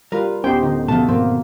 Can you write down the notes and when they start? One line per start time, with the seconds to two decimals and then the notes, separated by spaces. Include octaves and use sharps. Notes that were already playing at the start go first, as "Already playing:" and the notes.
0.12 G3 F4 A#4 B4
0.44 D1 B3 C#4 D#4 G4 C5 G5
0.63 D3 D#4
0.88 B2 F3 A3 A5
1.09 G#2 D#3 F3 A#3 C4